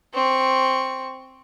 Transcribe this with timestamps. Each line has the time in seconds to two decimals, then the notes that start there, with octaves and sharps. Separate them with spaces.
0.14 C4 C#6